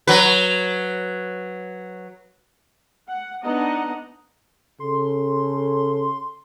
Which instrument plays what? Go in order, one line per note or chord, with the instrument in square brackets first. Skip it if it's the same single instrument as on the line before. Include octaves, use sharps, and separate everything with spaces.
[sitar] F#3 B4
[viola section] F#5
B3 D4 D#4 D#5 F#5 A#5
[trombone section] C#3 A4 [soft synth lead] C6